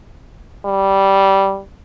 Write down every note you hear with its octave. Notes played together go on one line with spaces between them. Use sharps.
G3